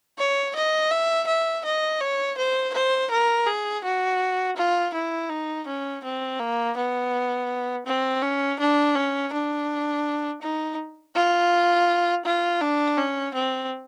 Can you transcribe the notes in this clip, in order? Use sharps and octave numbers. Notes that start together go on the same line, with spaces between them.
C#5
D#5
E5
E5
D#5
C#5
C5
C5
A#4
G#4
F#4
F4
E4
D#4
C#4
C4
A#3
B3
C4
C#4
D4
C#4
D4
D#4
F4
F4
D4
C#4
C4